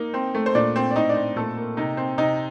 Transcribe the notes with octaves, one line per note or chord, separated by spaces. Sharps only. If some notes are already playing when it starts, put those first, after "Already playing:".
Already playing: A#3 D#4
C4
A3
C5
A#2 D4 D5
C4
D5
A2 D#4 D#5
D4 D5
C4
A#2 A3 A4
A#3
C3 D#4 D#5
C4
C3 D#4 D#5